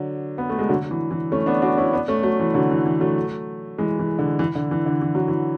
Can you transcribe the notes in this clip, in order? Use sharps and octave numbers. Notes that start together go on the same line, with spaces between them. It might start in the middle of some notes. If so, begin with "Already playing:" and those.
Already playing: D3 F#3
B3
A3
G#3
D3 F#3
E3
E3
A3 C#4
B3 D4
D4 F#4
C#4 E4
B3 D4
A3 C#4
F#3 A3
E3
D3 F#3
E3
E3
F#3 A3
E3 G#3
E3
D3
E3
D3
E3
D3
E3
F#3
E3